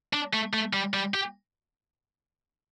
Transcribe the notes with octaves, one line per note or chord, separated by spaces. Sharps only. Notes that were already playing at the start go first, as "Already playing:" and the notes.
D4
A3
A3
G3
G3
G4